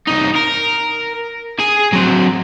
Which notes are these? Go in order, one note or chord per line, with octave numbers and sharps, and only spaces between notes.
C2 D#4
A#4
G#4 G#5
F#3 C4